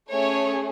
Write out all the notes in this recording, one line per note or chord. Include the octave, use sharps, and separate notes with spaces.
A3 C#4 G#4 C#5